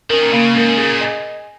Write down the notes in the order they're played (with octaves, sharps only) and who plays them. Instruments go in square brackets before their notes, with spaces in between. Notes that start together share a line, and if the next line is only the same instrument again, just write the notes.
[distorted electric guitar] D#3 [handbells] C#4 A#4
[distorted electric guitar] A#2
[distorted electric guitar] C#3 [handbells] A#3
[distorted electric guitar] G#2 [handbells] C#4 A#4
[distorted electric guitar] A#2 [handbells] G#4
[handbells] D#5 G#5